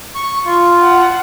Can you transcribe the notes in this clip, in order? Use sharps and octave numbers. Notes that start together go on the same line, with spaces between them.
C#6
F4
F#5